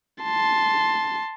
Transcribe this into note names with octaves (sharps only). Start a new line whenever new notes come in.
A5 C6